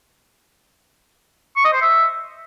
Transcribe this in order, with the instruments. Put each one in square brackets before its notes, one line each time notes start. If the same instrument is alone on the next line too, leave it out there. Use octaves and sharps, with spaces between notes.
[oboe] C#6
D#5
C5
E5